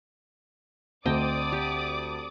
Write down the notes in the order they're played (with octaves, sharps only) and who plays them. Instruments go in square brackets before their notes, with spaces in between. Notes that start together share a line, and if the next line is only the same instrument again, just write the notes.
[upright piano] D2 [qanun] C4 D#5 G5 [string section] D5 D6 D#6
[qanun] G4